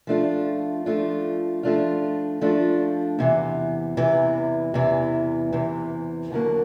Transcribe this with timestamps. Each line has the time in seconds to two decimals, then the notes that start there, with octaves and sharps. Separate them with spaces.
0.07 F3 A3 D4 F4
0.86 F3 A3 D4 F4
1.63 F3 A3 D4 F4
2.41 F3 A3 D4 F4
3.19 E2 C3 E3
3.97 E2 C3 E3
4.74 E2 C3 E3
5.52 E2 C3 E3
6.31 D#2 D3 F#3 A#3